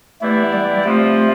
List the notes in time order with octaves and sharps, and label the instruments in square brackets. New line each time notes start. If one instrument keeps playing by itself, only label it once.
[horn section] E3 B3 E4 G4 D5 [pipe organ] A3
[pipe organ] G3
[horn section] C3 F3 C4 F4 [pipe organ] A3